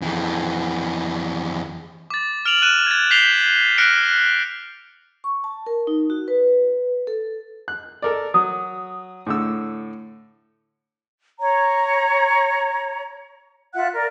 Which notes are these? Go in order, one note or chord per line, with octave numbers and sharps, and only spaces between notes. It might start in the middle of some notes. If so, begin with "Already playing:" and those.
F2 E3
D6 A6
F6 D7 F7 F#7
F6 F#6 D#7 E7
G#6 A6
G6 B6 C7 F7 G7
F6 F#6 A#6 C#7 D7
C#6
A5
A#4
D#4
F#4
B4
A4
F#6
A4 A#4 D5
F#3 D#6
A2 D3 E6
C#5 A#5
F4 E5 F#5 F#6
A#4 D5